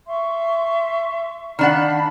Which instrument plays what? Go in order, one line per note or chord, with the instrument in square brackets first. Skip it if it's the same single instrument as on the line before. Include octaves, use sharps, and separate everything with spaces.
[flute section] E5 C6 C#6
[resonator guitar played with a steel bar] D#3 D4 F#5 [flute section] D5 F5 B5